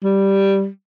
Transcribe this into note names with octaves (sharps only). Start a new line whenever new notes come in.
G3